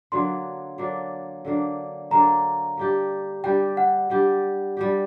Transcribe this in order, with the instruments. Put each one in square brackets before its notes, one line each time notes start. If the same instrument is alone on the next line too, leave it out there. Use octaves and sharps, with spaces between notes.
[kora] D3 F#3 A#3 D4 [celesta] C6
[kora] D3 F#3 A#3 D4
D3 F#3 A#3 D4
[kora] D3 F#3 A#3 D4 [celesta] A#5
[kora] G3 D4 G4
[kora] G3 D4 G4 [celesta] G5
[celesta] F#5
[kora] G3 D4 G4
G3 D4 G4